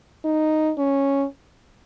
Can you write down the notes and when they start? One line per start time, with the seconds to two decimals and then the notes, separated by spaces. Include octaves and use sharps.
0.25 D#4
0.78 C#4